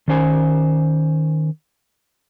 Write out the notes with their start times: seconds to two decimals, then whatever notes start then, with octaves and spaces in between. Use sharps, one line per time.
0.08 D#3 C#4 C5 G#5